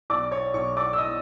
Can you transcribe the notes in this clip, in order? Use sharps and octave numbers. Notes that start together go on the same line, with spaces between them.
B1 D5 D6
C#5 C#6
B1 C#5 C#6
D5 D6
E6
D#5 D#6